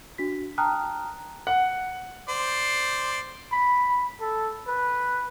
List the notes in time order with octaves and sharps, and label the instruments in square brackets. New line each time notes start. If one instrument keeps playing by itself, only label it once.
[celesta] D4 F#4 B6
G5 A5 A#5 D#6 F6 F#6
[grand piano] F#5
[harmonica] C5 D5
[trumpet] B5
A4
B4